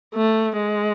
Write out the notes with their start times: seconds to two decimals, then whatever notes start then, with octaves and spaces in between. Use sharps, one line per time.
0.15 A3
0.57 G#3